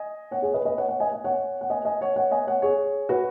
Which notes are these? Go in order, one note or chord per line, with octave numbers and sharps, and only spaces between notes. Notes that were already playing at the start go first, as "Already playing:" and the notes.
Already playing: D#5 G#5
C#5 F#5
G#4 C#5
B4 D#5
B4 D#5
C#5 F#5
C#5 F#5
D#5 G#5
D#5 G#5
C#5 F#5
F#5
D#5 G#5
D#5 G#5
C#5 F#5
C#5 F#5
D#5 G#5
C#5 F#5
G#4 C#5
F#4 B4